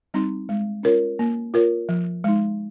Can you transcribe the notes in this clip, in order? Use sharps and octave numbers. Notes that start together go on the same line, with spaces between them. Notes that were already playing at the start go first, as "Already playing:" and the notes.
G3 C4 D#4
G#3
C#4 F4 A#4 C#5
A#3
F4 A#4 C#5
F3
G#3 D#4